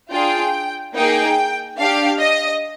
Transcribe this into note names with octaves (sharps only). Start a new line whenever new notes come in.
D4 F4 G#4 G5
A#3 D#4 G#4 G5
D4 G4 F5
D#5